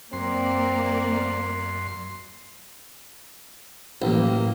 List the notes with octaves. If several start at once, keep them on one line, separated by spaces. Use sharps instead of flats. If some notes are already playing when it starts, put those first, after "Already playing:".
F#2 A#3 C4 A#4 D5 C6
A1 A2 F#3 A#3